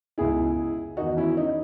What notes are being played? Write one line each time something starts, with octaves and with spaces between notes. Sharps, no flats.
C#2 B2 E4 G#4
E2 D#3 D#4 F#4
C#4 E4
D#4